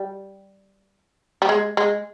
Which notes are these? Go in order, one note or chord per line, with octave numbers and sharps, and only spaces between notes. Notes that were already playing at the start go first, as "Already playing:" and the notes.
Already playing: G3
G3
G#3
G#3